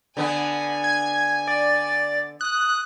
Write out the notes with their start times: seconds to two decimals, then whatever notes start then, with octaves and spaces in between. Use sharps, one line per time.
0.17 D3 B3 D4 G#5
0.84 G#6
1.47 D5 A6
2.41 D#6 F#6